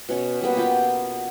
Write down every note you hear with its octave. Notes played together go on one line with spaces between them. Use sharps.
B2 C#4 C#5
B2 G3 A#3 B3
F4 G4 G5